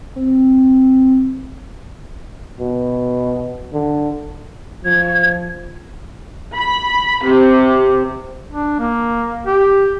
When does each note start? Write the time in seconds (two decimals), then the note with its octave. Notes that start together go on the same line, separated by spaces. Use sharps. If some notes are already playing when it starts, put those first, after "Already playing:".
0.16 C4
2.60 B2
3.73 D3
4.85 F3 G#6
6.55 B5
7.26 C3
8.51 D4
8.79 A#3
9.46 G4